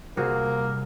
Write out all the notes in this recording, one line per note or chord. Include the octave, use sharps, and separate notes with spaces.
C2 C3 A#3 F#4 G#4 A#4 C5